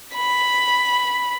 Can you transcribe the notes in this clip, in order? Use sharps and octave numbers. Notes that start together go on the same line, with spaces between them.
B5